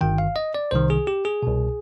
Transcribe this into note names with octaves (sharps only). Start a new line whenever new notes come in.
G1 G2 D#3 G5
F5
D#5
D5
C2 C3 D#3 C5
G#4
G4
G#4
C2 B2